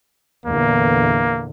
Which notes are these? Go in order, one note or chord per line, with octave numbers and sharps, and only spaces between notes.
E2 A#2 D3 A#3